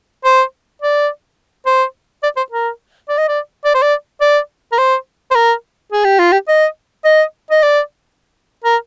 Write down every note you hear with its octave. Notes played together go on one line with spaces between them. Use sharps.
C5
D5
C5
D5
C5
A#4
D5
D#5
D5
D5
C5
D5
D5
A#4
C5
C5
A#4
G#4
G4
F4
G4
D#5
D#5
D#5
D5
A#4